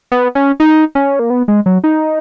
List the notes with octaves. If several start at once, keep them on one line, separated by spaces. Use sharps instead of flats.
B3
C#4
D#4
C#4
A#3
B3
G#3
F#3
D#4